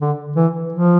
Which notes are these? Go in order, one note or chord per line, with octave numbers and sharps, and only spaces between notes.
D3
E3
F3